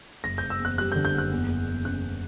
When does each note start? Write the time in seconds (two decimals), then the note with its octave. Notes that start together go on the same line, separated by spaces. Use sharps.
0.24 F#1 A#6
0.38 G6
0.42 F#1
0.50 E6
0.60 E2
0.65 F#6
0.78 G3 F#6
0.92 G6
0.95 D3
1.05 G6
1.13 F#1
1.18 F#6
1.32 E2
1.48 E2
1.67 E2
1.85 C#3 F#6
2.03 C#3